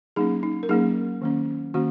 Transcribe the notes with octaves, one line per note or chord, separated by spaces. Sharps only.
F#3 A#3 C#4 D#4 G#4
D#4
A#4
F#3 A#3 C#4 D#4 G#4
D#3 A#3 C#4
D#3 A#3 C#4 F#4